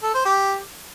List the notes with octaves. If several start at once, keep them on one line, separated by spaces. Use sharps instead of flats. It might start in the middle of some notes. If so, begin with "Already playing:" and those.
A4
C5
G4